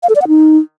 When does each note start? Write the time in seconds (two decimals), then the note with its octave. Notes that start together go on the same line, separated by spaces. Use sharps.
0.03 F5
0.09 A4
0.16 D5
0.22 F#5
0.28 D#4